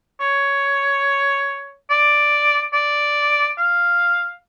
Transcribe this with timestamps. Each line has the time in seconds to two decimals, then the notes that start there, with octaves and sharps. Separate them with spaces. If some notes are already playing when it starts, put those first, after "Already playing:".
0.21 C#5
1.90 D5
2.73 D5
3.58 F5